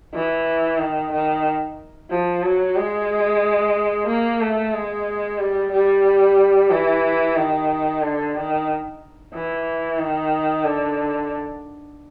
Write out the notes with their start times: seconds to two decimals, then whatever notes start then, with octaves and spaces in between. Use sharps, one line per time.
0.14 E3
0.79 D#3
1.12 D#3
2.10 F3
2.43 F#3
2.76 G#3
4.07 A#3
4.41 A3
4.73 G#3
5.39 G3
5.72 G3
6.70 E3
7.36 D#3
8.02 D3
8.35 D#3
9.33 E3
9.99 D#3
10.64 D3